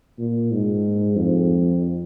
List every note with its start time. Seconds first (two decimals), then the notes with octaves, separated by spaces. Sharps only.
0.19 A#2
0.51 G#2
1.17 F2